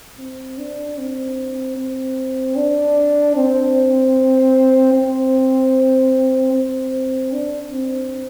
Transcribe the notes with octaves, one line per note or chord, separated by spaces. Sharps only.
C4
D4
C4
C4
D4
C4
C4
C4
D4
C4